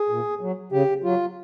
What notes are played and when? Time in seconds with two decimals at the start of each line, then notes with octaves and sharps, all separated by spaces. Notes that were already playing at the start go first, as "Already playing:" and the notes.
Already playing: G#4
0.09 A#2
0.41 F#3
0.72 C#3 G4
1.04 F#3 F4